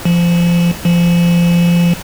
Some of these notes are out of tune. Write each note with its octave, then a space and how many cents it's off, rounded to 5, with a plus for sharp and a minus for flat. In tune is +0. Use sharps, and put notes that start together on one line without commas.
F3 -20
F3 -20